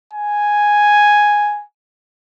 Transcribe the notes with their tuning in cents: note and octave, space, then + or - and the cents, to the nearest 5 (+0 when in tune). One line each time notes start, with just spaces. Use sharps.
G#5 +0